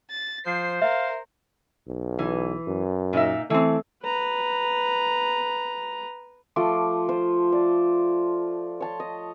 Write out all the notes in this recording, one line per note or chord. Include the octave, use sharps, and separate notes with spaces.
A6
F3 C5 C7
A#4 E5 F5
B1
E3
F#2
A#2 D#4 E5
E3 A3 C4
B4 A#5
F3 A3 C6 D6
F4 C5
D5
C#5 A5 C6
D#5